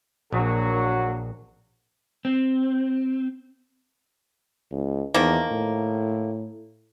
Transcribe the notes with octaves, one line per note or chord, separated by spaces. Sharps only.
A#1 F#3 A#3 D4 F#4
C4
C#2
E2 D#3 F3 A#3
A2